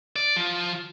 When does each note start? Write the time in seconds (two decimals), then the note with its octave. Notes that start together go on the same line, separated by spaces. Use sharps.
0.16 D5
0.36 F3 F4